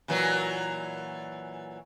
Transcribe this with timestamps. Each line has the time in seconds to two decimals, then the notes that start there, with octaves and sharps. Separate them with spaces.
0.08 A#2 E3 F#3